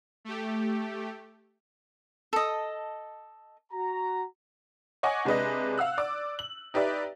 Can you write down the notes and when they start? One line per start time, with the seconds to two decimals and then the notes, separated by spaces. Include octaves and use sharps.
0.25 A3 G4
2.33 A4 D#5
3.72 F#4 A#5
5.03 C#5 D#5 F#5 G#5 D6
5.25 C3 G#3 D4 B4 D#5
5.78 F5 F#5 E6 F#6
5.98 D5 D6
6.39 F#7
6.74 D#4 G4 B4 D5 E5